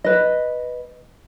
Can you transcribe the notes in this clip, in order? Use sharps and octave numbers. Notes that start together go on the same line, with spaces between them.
B4 D#5